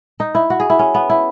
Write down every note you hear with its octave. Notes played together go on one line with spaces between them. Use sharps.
D#4
E4
F#4
G#4
E4
C#4
B3
E4